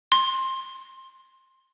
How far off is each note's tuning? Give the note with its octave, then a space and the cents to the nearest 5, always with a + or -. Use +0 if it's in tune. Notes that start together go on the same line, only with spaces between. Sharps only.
C6 +15